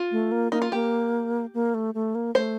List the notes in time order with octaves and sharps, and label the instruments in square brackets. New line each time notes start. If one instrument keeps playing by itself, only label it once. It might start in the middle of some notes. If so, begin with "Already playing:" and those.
Already playing: [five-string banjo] F4
[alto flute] A3
A#3
[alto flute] A#3 [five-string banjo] D#4
[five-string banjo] F4
[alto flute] A#3 [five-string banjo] G4
[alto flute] A#3
A3
A3
A#3
[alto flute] A3 [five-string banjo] C5